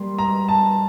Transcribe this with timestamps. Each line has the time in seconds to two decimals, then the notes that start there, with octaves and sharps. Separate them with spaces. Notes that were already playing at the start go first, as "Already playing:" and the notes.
Already playing: G3 A#3 C6
0.19 A#5
0.48 A5